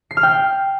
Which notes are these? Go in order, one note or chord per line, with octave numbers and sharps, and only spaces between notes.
C7
F6
G5
F6